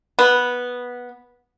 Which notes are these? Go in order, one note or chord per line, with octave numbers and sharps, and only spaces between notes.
B3